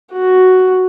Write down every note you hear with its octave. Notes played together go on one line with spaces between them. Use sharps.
F#4